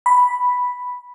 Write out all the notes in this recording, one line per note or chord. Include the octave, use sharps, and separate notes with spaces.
B5